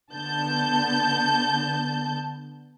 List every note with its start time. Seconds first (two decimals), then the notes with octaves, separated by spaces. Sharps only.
0.13 D3 B3 A5 G6